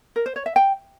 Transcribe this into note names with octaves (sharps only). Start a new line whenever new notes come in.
A#4
C5
C#5
E5
G5